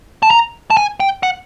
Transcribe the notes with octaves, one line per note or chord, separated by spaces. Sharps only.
A5
A#5
A5
G#5
G5
F#5